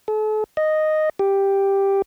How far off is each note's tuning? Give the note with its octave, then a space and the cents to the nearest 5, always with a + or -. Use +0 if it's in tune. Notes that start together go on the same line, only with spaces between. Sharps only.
A4 -40
D#5 -5
G4 +5